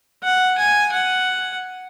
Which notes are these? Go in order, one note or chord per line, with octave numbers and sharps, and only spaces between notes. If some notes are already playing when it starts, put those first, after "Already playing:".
F#5
G#5
F#5